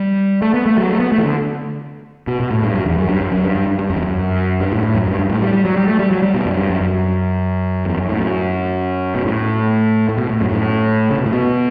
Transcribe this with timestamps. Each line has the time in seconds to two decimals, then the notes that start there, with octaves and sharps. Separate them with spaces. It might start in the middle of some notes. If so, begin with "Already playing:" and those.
Already playing: G3
0.42 A3
0.54 B3
0.66 A3
0.77 F#3
0.89 A3
1.00 B3
1.12 A3
1.18 E3
1.23 D3
2.27 B2
2.40 B2
2.51 A2
2.63 G2
2.74 F#2
2.86 E2
2.98 F#2
3.09 G2
3.21 F#2
3.32 F#2
3.44 G2
3.55 G2
3.67 G2
3.79 G2
3.90 F#2
3.96 E2
4.03 F#2
4.60 G2
4.72 A2
4.83 A2
4.95 F#2
5.07 G2
5.19 G2
5.29 A2
5.42 G3
5.53 G3
5.65 F#3
5.76 G3
5.87 A3
5.99 G3
6.11 F#3
6.22 G3
6.34 B2
6.46 F#2
6.57 G2
6.70 F#2
6.81 F#2
7.85 E2
7.98 F#2
8.09 A2
8.20 F#2
9.15 B2
9.25 A2
10.09 A2
10.18 B2
10.29 A2
10.41 F#2
10.52 A2
11.11 C#3
11.18 B2
11.26 A2
11.33 B2